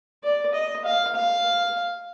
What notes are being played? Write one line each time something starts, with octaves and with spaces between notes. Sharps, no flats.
D5
D#5
F5
F5